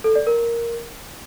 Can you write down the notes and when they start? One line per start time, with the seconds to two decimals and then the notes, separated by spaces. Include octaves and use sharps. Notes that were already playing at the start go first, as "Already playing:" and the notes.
0.04 A4
0.15 D5
0.27 A#4